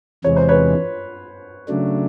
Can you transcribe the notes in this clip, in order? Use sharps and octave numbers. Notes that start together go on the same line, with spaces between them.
E2 C3 E3 G#3 C#5
C5
B4 C#5
C#3 F#3 A3 D4